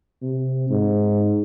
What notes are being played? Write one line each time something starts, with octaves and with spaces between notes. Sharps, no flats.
C3
G#2